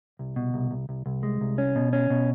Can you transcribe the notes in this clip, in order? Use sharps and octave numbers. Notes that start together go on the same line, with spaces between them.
C2
B2
C2
C2
C2
C2
G#3
C2
C#4
B2
C#4
B2